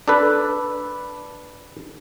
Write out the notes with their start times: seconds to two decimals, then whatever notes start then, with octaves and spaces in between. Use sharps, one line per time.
0.08 D4 A4 B4